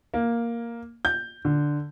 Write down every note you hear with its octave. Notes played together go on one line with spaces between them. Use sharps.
A#3
G6
D3